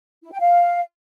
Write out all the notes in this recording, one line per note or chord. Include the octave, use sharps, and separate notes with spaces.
E4
G5
F5